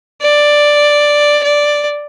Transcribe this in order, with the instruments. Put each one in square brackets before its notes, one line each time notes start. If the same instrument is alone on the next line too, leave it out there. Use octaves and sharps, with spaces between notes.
[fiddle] D5
D5